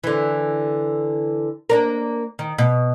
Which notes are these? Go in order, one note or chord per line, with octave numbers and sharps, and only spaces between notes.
D3 E3
A#3 D4 A#4
D#3
B2